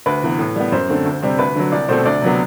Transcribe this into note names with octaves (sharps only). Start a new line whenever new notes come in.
D2 B4
C3 E3 B3
A2
G3 B3
F#2 C5
D3 A3 C4
D2
C3 G3 C4
D2 B4
D3 F#3
C2 D5
B2 A3 C4 C5
D2 D5
C3 F#3 B3